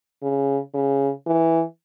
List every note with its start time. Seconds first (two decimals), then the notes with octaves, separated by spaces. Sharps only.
0.22 C#3
0.74 C#3
1.27 E3